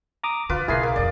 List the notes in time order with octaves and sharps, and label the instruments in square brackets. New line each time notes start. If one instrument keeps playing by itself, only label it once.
[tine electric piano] A#5 D6 D#6
[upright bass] D3 [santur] F4 B4 [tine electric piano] D6
[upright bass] B1 C#3 [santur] A#3 G#4 [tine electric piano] E4 C7
[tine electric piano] A#4 [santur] D6
[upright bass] A#1 F2 [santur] D5 D#5